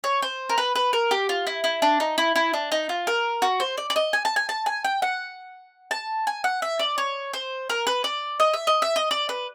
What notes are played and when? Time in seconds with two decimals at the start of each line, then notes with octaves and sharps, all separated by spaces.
0.04 C#5
0.22 C5
0.49 A#4
0.58 B4
0.75 B4
0.93 A#4
1.11 G4
1.29 F4
1.47 E4
1.64 E4
1.82 D4
2.00 D#4
2.18 E4
2.36 E4
2.54 D4
2.72 D#4
2.89 F4
3.07 A#4
3.42 F#4
3.60 C5
3.78 D5
3.90 D5
3.96 D#5
4.13 G#5
4.25 A5
4.36 G#5
4.49 A5
4.66 G#5
4.84 G5
5.02 F#5
5.91 A5
6.27 G#5
6.44 F#5
6.62 E5
6.79 D5
6.98 C#5
7.33 C5
7.70 A#4
7.87 B4
8.04 D5
8.40 D#5
8.54 E5
8.67 D#5
8.82 E5
8.96 D#5
9.11 D5
9.29 B4